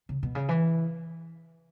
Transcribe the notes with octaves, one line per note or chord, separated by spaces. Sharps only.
C#3
B2
C#3
E3